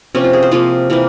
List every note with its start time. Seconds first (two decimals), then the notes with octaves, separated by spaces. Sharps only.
0.15 C3 F3 A#3 C#4
0.24 F4
0.33 G#4
0.43 C5
0.51 C3 F3 A#3 F4
0.90 C3 E3 A#3